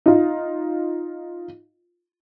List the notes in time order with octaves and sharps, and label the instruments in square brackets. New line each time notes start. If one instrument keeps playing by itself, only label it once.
[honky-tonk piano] D#4 F4